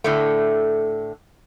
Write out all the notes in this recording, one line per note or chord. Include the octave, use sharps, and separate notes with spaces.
A2 D3 A3